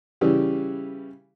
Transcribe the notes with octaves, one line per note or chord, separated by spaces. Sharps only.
C#3 E3 G3